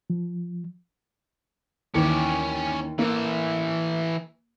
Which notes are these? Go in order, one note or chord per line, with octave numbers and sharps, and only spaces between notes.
F3
D#2 E3 C#4 D5 C#7
E3 A#3 A4